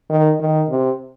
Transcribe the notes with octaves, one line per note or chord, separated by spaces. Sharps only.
D#3
D#3
C3